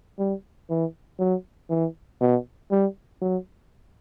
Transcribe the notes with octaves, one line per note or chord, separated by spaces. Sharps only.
G3
E3
F#3
E3
B2
G3
F#3